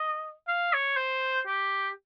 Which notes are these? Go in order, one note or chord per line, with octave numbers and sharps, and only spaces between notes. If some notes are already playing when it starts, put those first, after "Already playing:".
Already playing: D#5
F5
C#5
C5
G4